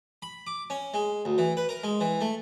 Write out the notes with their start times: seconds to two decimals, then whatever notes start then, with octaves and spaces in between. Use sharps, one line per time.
0.22 B5
0.47 D6
0.70 C#4
0.94 G#3
1.25 D2
1.38 E3
1.57 B4
1.69 A#4
1.84 G#3
2.01 E3
2.21 A3